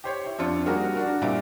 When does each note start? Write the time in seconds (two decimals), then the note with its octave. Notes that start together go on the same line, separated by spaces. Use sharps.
0.04 G4 C5 C#5
0.26 E4
0.38 F2 C4 D4 F4 C#7
0.66 G3 A#3 F#4 G#4 A#4
0.95 D4 F#4 A#4
1.22 A#2 G3 C4 E4 D7